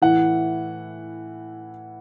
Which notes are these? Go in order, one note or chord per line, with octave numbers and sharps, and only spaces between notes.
A2 E3 F#5